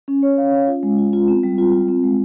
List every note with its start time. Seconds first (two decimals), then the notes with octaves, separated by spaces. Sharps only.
0.08 C#4
0.23 C#5
0.38 F5
0.53 C#4
0.68 F4
0.83 G#3
0.98 F4
1.13 F4
1.28 C4
1.43 G3
1.58 F4
1.73 F4
1.89 C4
2.03 G#3